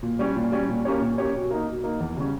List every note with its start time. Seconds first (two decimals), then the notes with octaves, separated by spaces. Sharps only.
0.03 A#2
0.19 G3 C#4
0.36 A#2
0.52 G3 C#4
0.69 A#2
0.85 A#3 C#4 G4 C#5
1.01 A#2
1.18 A#3 C#4 G4 C#5
1.35 B2
1.51 A#3 D#4
1.67 B2
1.84 A#3 D#4
2.00 E2
2.17 C#3 G3 C#4